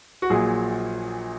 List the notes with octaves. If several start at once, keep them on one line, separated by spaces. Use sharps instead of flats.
F#4
A#1 A#2 F#3 G#4